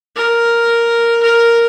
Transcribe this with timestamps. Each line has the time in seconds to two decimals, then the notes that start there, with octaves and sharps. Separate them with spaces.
0.16 A#4
1.23 A#4